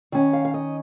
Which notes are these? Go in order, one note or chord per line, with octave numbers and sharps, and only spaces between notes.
D#3 C#4
F5
F5
D#5